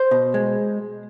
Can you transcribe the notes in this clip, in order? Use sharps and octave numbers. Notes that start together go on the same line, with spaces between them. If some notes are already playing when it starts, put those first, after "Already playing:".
Already playing: C5
B2
G#3